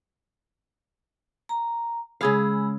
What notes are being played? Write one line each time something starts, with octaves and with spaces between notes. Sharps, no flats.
A#5
C#3 G#3 G#4 F5 B5 E6